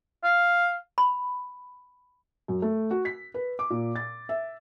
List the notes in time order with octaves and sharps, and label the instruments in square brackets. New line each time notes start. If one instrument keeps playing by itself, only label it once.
[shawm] F5
[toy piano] B5
[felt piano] F#2
A3
F#4
B6
B4
D6
A#2
A6
E5